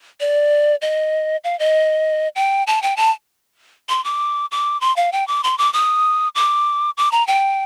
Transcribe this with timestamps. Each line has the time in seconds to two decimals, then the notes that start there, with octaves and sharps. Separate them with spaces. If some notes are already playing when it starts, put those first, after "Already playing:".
0.20 D5
0.82 D#5
1.44 F5
1.59 D#5
2.36 G5
2.67 A5
2.82 G5
2.97 A5
3.89 C6
4.04 D6
4.51 D6
4.81 C6
4.96 F5
5.12 G5
5.28 D6
5.44 C6
5.58 D6
5.73 D#6
6.35 D6
6.97 D6
7.12 A#5
7.27 G5